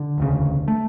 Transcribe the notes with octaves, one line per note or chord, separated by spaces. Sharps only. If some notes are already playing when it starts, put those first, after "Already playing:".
Already playing: D3
E1 D2 C#3
A3